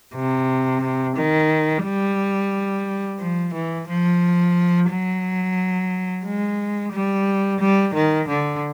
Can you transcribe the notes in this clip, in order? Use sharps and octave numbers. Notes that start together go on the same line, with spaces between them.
C3
D#3
G3
F3
E3
F3
F#3
G#3
G3
G3
D#3
D3